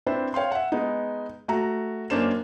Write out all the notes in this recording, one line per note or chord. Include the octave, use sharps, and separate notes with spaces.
C4 D4 E4 B4 C5
C#5 F5 G5 C6
E5 F#5
G#3 B3 D#4
A3 F#4 A#5
F#2 A#3 C#4 D4 C5 E7